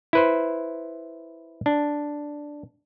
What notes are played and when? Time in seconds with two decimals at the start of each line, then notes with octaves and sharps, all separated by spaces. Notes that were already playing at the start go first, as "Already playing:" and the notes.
0.13 E4 B4 C5
1.66 D4